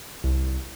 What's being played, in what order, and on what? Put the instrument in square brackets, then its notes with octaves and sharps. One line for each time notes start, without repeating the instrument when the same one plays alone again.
[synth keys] C2